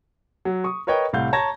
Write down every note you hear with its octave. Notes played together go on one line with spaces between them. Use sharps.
F#3
C#6 D#6
A#4 B4 C#5 D#5 G5
C2 A2 F5 F#5 G6
C#5 A5 A#5 G#6 A#6